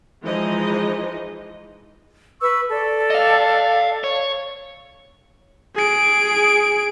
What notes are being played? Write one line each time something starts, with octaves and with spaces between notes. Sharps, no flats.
E3 F3 G#3 D#4 D#5
B4 C#6 E6
A4 D5
D#5 F5
C#5
G#4 D7